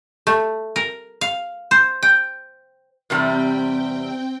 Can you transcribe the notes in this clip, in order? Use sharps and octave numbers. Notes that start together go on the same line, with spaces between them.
A3
A#4
F5
C5
G5
E2 C3 G3 C4 G5